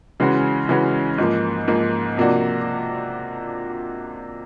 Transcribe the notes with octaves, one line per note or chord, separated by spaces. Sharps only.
C#3 E3 G#3 C#4 F#4
C#3 E3 G#3 C#4 F#4
G#2 F3 A#3
G#2 F3 A#3
C3 F3 A#3 D4 F#4